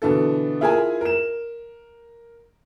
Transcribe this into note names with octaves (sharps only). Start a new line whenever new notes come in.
B2 D3 E3 A4
E4 F4 G#4 A#4 G#5
A#4 E7